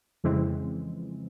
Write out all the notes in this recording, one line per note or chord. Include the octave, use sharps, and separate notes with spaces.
F2 C#3 E3 G#3 C4